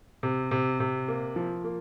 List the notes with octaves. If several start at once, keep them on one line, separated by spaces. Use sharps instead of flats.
C3
C3
C3
A#3
F3
A#3